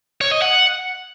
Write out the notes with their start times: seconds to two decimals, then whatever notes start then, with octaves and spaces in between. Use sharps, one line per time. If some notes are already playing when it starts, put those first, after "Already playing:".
0.21 C#5
0.31 D#5
0.42 F#5